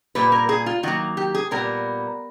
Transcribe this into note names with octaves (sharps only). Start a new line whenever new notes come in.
A#2 G3 A#3 B4
A#4
G#4
F4
D#3 F#3 A#3 F#4
G4
G#4
A#2 G3 B3 A#4